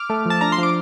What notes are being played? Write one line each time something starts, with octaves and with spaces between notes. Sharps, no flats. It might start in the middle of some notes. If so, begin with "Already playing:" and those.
Already playing: D6 F6
A3
F3 A5
D4 A#5
C6
F3
D6